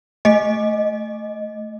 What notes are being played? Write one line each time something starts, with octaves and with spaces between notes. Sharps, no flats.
A3 D#5